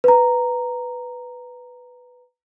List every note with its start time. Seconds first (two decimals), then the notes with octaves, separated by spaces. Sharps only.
0.04 B4 A#5